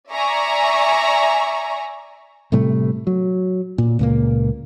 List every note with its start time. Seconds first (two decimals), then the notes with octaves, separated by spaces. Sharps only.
0.11 D5 E5 G#5 A#5 C#6
2.52 A2 C3 G3 A3
3.07 F#3
3.78 A#2
3.99 C#2 A#2 A#3